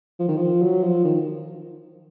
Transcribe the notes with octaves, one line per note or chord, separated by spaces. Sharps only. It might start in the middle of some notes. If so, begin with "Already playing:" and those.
F3
D#3
F3
F#3
F3
D#3
D#3